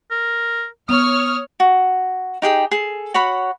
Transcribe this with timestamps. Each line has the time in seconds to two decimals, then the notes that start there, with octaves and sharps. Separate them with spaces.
0.11 A#4
0.89 B3 C#5 D#6 F6
1.60 F#4
2.42 D#4 G4 G#4 G5
2.71 G#4 A4
3.14 F#4 C#5 F#5 B5